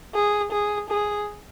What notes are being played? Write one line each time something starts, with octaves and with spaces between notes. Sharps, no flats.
G#4
G#4
G#4